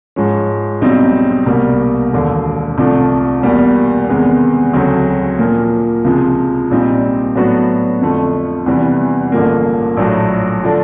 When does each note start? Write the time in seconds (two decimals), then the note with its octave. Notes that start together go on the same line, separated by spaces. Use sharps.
0.16 G#2 F3 G#3 C#4
0.81 B1 B2 G3 C4 D#4
1.46 C2 B2 G3 A#3
2.13 E1 D#2 D3
2.78 C2 C3 F3 A3 D4
3.43 E2 B2 G3 A#3
4.08 E2 C3 D#3 G#3 B3
4.73 D2 C#3 F#3 A3 C4
5.39 A#2 F3 A#3
6.04 C#2 C3 F3 G#3
6.71 A#1 A#2 G3 C4 D#4
7.35 A2 F#3 B3 D4 F#4
8.02 F2 D3 F3 A3
8.66 E2 C3 E3 G3
9.32 A1 G2 D3 F3 A#3
9.97 A#1 A2 F#3 A3
10.63 D3 F3 A3 D4